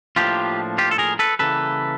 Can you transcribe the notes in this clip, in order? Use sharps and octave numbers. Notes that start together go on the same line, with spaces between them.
A2 F3 A#3 D4 F4 G4
F4 G4
A4
G#4 A#4
A4 B4
C#3 E3 G3 A#3 A4 B4